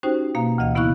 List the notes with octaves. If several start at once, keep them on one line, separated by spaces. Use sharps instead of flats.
C#4 D#4 F#4 G4 C5 G5
B2 A#3 F5 A#5
D2 E3 D#5 F5
C#3 B3 E4 F5 C#6 F#6